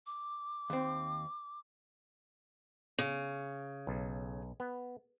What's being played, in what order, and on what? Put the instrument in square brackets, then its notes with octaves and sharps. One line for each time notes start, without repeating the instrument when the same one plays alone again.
[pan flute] D6
[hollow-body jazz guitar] D#2 C4
[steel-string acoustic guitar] C#3
[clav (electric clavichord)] B1
B3